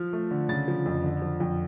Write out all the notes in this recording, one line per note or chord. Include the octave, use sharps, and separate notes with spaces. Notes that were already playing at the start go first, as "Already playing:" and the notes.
Already playing: F3 F6
A3
D3
C#3 A6
F3
F2
D3
F3
F2